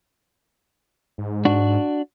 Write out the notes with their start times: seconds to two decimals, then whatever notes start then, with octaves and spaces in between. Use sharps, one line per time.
1.18 G#2
1.45 D4 F#4